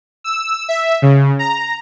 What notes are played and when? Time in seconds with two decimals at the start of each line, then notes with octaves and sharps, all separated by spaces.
0.24 E6
0.69 E5
1.02 C#3
1.39 A#5